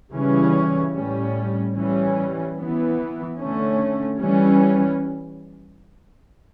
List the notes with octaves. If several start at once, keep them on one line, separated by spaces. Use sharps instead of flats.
C#3 E3 G3 C#4
A2 G3 C#4
E3 G3 C#4
E3 B3
D3 A3 C#4
E3 G3 C#4